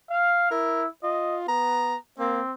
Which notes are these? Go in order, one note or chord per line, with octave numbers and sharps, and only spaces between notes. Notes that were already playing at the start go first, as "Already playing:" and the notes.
F5
E4 A#4
F4 D#5
B3 A#5
A#3 C4